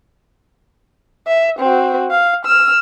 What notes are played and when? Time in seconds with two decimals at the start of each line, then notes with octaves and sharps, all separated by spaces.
1.27 E5
1.59 C4 F#4
2.11 F5
2.46 E6 F6